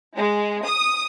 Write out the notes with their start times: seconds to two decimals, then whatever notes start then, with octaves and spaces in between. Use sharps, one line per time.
0.17 G#3
0.66 D#6